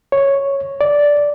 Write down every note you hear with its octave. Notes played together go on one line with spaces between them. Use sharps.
C#5
D5